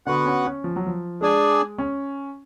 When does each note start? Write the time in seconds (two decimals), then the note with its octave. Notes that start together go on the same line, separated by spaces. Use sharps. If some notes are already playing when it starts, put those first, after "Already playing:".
0.06 D3 B3 F#4 B4 F#5
0.26 C#4
0.45 C#4
0.64 F3
0.76 F#3
0.87 F3
1.21 G#3 D4 G#4 D5 G#5
1.78 C#4